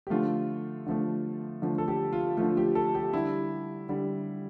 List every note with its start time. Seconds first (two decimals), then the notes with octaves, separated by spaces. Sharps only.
0.07 G4
0.10 D3 F3 A3 F4
0.86 D3 F3 A3
1.62 D3 F3 A3
1.78 A4
1.88 G4
2.13 F4
2.37 D3 F3 A3 F4
2.57 G4
2.75 A4
2.95 G4
3.13 D3 G3 E4
3.89 D3 G3